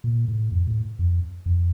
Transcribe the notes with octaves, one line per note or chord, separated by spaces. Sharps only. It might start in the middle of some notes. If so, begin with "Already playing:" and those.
A#2
A2
F2
A2
F2
F2